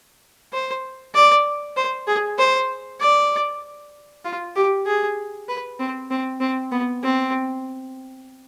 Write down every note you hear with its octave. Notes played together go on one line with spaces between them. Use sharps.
C5
D5
C5
G#4
C5
D5
F4
G4
G#4
B4
C4
C4
C4
B3
C4